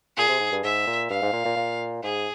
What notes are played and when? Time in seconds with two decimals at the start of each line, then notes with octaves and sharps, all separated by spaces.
0.17 A#2 G#4
0.28 C3
0.40 G#2
0.52 G2
0.64 G#2 E5
0.87 A#2
1.10 G2 F5
1.22 G#2
1.33 A#2
1.45 A#2
1.56 A#2
2.03 G#2 G#4